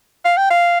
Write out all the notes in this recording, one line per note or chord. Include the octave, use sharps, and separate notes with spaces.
F5
G5
F5